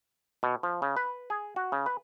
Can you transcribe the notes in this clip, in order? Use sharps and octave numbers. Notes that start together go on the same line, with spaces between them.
B2
F3
C#3
B4
G#4
F#4
C#3
B4